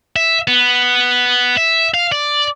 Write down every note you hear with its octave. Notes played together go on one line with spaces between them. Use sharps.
E5
B3
E5
F5
D5